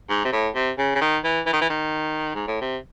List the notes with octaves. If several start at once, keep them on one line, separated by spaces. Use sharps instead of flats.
G#2
C3
A2
C3
C#3
C#3
D#3
E3
E3
D#3
E3
D#3
G#2
A2
C3